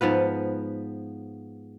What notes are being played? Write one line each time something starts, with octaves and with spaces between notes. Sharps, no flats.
G#2 F3 B3 B4